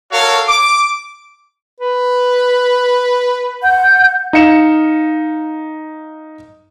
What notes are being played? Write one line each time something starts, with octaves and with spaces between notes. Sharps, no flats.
F#4 A4 A#4 C#5 F5
D6
B4
F#5 G6
D#4 F5 C#7 E7